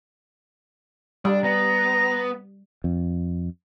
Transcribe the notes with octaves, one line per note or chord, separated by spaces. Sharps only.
G3 D4
B3 A#5
F2